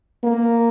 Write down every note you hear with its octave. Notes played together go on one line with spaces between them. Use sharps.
A#3